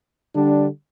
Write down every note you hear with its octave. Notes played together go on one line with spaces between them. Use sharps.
D3 G3 D4